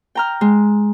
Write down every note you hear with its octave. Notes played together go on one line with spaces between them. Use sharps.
G5 A#5 F6
G#3